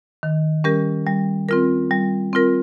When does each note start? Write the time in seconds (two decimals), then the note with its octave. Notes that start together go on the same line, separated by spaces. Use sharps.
0.23 D#3
0.64 G3 C#4 G4 A#4
1.07 G3
1.49 C4 F4 A#4
1.91 G3
2.33 C4 F4 A#4